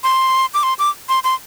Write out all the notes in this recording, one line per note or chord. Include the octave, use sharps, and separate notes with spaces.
C6
D6
C6
D6
C6
C6